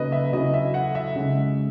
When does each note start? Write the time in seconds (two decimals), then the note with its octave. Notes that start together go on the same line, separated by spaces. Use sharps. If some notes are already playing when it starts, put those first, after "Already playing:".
Already playing: C#3 F#3 A#3 D#4 B4 D#5
0.12 E5
0.33 C#3 F#3 C#4 E4 D#5
0.54 E5
0.74 F#5
0.95 E5
1.16 C#3 G#3 D#4